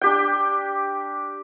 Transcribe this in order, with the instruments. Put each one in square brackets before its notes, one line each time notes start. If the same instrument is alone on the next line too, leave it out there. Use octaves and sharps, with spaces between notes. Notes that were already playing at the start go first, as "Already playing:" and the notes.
[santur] D4 G4 G5